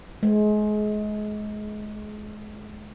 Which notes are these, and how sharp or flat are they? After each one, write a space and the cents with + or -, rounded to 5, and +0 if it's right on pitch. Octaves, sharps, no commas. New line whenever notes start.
G#3 +30